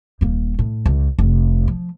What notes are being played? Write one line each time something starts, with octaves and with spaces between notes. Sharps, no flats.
D#1 A#3
A2
C#2
F1
F3